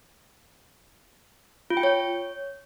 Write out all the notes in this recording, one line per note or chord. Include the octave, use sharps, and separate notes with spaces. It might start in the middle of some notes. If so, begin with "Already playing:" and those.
F4
G5
C#5